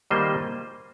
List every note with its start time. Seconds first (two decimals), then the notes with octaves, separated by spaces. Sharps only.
0.10 D#3 G3 A#3 D#4 C5 D#5